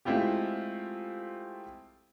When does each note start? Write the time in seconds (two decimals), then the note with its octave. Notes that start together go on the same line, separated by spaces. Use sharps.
0.05 G#3 A3 C4 E4 F4 G4